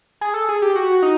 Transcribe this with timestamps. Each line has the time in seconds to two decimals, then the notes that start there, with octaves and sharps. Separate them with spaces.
0.21 G#4
0.34 A4
0.49 G#4
0.62 G4
0.75 F#4
1.02 D#4